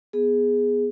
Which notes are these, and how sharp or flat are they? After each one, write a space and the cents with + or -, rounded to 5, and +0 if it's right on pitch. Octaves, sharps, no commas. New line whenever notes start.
B3 +0 G#4 +0